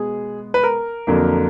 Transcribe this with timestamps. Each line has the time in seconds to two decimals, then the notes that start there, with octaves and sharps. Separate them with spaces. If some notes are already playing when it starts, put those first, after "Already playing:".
Already playing: B2 G#3 B3 G#4
0.54 B4
0.63 A#4
1.07 F2 D3 F#3 A#3